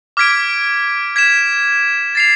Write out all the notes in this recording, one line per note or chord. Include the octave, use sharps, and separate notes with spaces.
D6 F6 G#6 B6 D7
G#6 B6 E7
A6 C7 F7